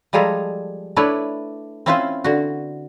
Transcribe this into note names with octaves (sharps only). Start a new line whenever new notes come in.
F3 G3 G#3 G#4 A4 A#5
A3 D4 E4 B4 C#5
C4 C#4 E4 F4 B4 C5
D3 F#4